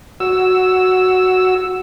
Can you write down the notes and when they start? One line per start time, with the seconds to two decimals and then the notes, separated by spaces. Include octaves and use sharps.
0.20 F#4 E6